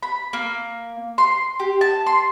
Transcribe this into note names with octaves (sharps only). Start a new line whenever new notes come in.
B5
A#3
C6
G4
A5
C6